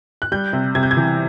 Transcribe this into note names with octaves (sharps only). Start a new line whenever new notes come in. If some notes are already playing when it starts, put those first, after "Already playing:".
F#6
G3 G6
C3
C3 G#6
G6
G#6
E3